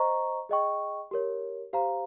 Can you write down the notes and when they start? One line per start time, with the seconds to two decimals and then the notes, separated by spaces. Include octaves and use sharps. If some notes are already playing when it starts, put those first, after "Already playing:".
Already playing: C5 D#5 A#5 C#6
0.49 G#4 D#5 G5 C#6
1.11 G4 A#4 C#5
1.73 G4 C5 F5 A#5